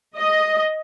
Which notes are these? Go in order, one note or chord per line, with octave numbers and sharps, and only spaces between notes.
D#5